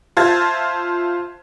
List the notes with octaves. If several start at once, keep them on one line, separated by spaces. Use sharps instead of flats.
F4 C5 E5 A5 G#6 A6